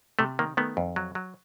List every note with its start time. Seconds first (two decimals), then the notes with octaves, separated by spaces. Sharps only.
0.19 C3 A3
0.39 D#3 A#3
0.57 D#3 A3 B3
0.77 F2
0.96 F#3
1.15 F#3